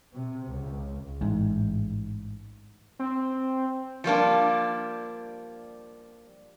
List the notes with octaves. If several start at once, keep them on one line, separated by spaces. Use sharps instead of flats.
C3
C#2
A1 G#2
C4
F3 G3 A#3 D4